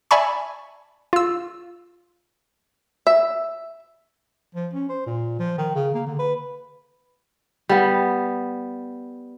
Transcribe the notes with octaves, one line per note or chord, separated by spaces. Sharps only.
D5 E5 G#5 A5 B5 C#6
F4 E6
E5
F3
C#4
C5
A#2
F3
D#3
C#3
A#3
D3
B4
G3 B3